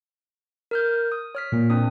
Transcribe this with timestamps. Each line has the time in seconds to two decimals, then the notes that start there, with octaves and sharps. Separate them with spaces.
0.71 A#4 F6 G6
1.12 D#6
1.35 C#5 F6 B6
1.52 A#2
1.70 C4 D4 D#6